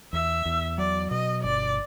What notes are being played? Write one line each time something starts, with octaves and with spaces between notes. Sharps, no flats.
E2 E5
E2
F#3 D5
B2 D#5
G1 D5